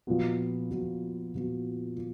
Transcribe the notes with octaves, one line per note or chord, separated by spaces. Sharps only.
A#2 F3 B3 F#4
A#2 F3 B3 F#4
A#2 F3 B3 F#4
A#2